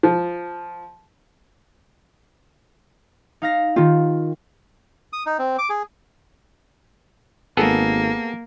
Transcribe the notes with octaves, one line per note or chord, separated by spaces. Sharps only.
F3
D#4 F5 A#6
D#3 F4 G4
D#6
D#4
C4
D6
G#4
G#1 A#3 B3 G#4 A4